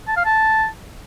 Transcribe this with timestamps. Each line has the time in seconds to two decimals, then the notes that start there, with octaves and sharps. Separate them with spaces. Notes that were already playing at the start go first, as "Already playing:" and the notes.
0.08 A5
0.17 F5
0.26 A5